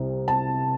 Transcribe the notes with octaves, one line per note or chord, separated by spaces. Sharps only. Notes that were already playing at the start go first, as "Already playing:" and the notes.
Already playing: C2 C3
A5